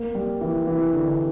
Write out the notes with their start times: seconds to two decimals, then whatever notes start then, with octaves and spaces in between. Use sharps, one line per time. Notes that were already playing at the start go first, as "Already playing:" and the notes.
Already playing: A#3
0.15 G3
0.41 E3
0.67 E3
0.94 D3